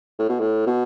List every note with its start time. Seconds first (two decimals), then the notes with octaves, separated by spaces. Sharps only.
0.19 A2
0.29 B2
0.40 A2
0.66 B2